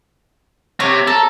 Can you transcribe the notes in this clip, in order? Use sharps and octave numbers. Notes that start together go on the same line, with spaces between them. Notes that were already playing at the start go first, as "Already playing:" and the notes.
C3 C#5
A4 A#4